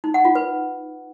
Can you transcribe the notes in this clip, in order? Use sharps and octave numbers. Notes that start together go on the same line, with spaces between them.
D#4
F#5
F4
B4